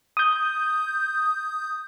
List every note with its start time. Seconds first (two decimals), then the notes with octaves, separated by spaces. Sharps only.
0.17 D#6 G6